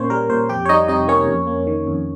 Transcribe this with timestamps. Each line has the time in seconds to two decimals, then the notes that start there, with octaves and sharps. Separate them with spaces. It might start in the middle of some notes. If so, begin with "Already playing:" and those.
Already playing: A#2 A#3 C#4 C5 C#5
0.10 G3 A#4
0.30 A#2 C5
0.49 F2 G4 G5
0.66 C#5
0.69 G3 D#4 D#5
0.88 C3 D#4 D#5
1.08 A#3 C#4 C#5
1.28 F2
1.47 A#3
1.67 D#3
1.87 F2